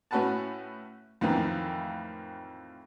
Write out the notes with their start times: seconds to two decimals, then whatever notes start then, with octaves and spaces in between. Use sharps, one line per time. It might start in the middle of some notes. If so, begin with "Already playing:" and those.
0.11 A2 C#4 F#4 B4 F#5 A5
1.21 F2 A2 D#3 E3 A#3